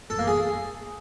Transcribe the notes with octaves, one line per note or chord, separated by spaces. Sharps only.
A4
A#3
G#4